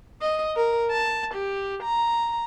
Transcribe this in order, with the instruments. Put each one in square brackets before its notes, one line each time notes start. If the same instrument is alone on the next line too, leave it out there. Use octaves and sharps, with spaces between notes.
[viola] D#5
A#4
A5
G4
A#5